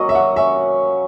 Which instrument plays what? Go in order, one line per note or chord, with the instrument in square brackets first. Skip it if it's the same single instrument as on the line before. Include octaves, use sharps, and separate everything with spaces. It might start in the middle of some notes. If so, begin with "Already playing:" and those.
Already playing: [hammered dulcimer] F#3 A#3 C#4 [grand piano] D#5
[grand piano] E5
F#5
[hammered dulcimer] C#4 [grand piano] E5